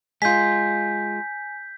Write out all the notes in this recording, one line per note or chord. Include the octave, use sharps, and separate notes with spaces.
G#3 F4 G#5 G6 B6